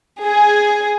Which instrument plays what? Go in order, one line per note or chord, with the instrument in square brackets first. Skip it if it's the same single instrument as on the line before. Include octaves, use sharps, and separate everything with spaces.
[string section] G#4